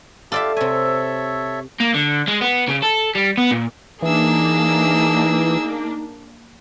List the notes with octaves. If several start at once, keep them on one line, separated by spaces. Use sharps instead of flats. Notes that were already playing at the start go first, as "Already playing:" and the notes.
F4 G4 A4 D5 E5 F5
C3 A4 C#5 E5 G#5
A#3
D3
G#3
B3
C#3
A4
G3
B3
A#2
E3 A#3 D4 D#4 G#4 E6